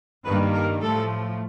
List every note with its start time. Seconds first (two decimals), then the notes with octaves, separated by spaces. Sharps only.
0.25 G2 D#3 G3 A#3 B4
0.53 A#4
0.81 A2 F3 A3 A4